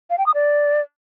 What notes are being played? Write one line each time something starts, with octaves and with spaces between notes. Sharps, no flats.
F5
G5
D#6
D5